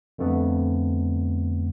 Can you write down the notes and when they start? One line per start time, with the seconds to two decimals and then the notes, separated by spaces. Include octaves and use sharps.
0.18 F2 D3 A3 B3